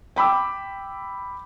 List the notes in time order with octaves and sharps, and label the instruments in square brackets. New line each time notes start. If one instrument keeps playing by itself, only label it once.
[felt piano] G5 B5 D6 E6